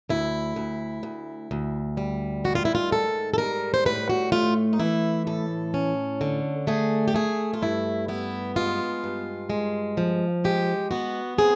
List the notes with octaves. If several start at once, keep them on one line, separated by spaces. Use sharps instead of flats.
D2 E4
D2
D2
D2
G3
D#3 F#4
F4
E4
F4
G#2 A4
A4
G3 A#4
C5
A2 B4
F#4
A3 F4
D#4
E3 E4
A2 A4
C#4
D3
A3 G#4
G4
A3 G#4
F4
G2 E4
B3 E4
G#3 F4
G2
G#3
F3
G#3 G4
B3 F#4
C4 G#4